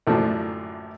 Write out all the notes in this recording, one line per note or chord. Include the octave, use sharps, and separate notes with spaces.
A1 F#2 A#2 D3 F3 D4